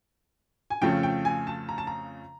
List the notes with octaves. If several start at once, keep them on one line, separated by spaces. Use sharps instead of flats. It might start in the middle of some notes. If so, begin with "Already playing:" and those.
G#5
F2 C#3 F3 A3 C#4 G5
G5
G#5
A5
A#5
A5
A#5